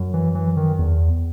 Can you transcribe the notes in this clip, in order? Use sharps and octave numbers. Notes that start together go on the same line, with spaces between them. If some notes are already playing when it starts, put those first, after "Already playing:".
Already playing: F#2
E3
E3
D#3
E2